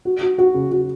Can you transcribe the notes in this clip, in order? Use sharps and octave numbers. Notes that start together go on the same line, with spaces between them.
F#4
F#4
F#4
C#3
F#4